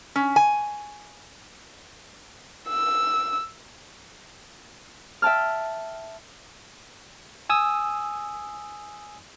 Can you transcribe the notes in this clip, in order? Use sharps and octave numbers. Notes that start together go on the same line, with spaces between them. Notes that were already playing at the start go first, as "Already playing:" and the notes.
C#4
G#5
E6
E5 G5 A5 F6
G#5 D#6 E6